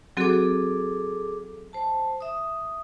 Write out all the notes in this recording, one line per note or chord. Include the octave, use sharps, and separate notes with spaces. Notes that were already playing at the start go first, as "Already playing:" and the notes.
F#3 C4 F#4 G#4 A4 D6
C5 A5
E5 D#6